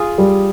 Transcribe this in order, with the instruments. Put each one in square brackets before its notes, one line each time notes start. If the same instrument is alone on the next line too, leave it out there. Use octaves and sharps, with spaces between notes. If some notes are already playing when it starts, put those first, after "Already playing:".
Already playing: [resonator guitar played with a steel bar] F4 G#4
[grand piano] G3